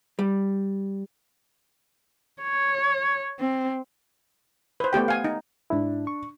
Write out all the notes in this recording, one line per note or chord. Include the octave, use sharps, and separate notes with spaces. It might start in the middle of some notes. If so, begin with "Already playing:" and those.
G3
C#5
C4
B4 C5
A3 B3 G4 G5
F5 G#5
D#4
G#2 D4 E4
C#6